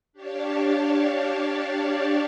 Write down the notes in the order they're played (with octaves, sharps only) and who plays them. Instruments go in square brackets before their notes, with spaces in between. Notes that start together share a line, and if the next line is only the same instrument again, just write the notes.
[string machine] D4 G4 C#5 D5 F5 A5